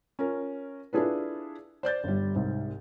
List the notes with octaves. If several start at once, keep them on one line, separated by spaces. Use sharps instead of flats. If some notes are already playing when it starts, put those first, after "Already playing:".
C#4 F4 A#4
D4 E4 F4 G#4 A4 B4
C5 D5 G6 A6
G1 G3
C2 G#2